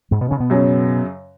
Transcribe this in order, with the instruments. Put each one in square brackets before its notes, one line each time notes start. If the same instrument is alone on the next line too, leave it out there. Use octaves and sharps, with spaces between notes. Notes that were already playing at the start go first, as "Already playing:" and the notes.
[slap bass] G#2 G#3
B2 B3
C#3 C#4
B2 B3
[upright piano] F#2 C#3 F#3